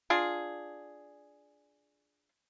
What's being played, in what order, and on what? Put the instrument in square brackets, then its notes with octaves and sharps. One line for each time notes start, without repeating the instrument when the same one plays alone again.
[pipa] D4 F4 G#4